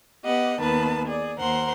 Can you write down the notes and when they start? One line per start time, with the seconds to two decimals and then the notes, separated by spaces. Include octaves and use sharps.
0.24 B3 G4 D#5 F#5
0.60 D#2 D#3 B3 B4 A5
1.06 G#4 D5
1.39 D#2 A#4 C5 F#5 C6